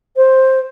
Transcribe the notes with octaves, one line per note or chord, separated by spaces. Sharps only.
C5